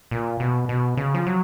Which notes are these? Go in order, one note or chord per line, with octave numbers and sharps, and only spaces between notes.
A#2
B2
B2
C#3
F3
F#3